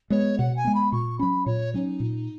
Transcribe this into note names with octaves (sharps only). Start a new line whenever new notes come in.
G#3 B3 C#5
B2 F#5
G#5
G#3 B3
B5
A#2 C#6
F#3 C#4 B5
A#2 C#5
F#3 C#4 D#4
A#2